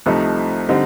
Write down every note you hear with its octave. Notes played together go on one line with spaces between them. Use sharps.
C2 C3 F3 A3 D#4
D3 G3 C4 D#4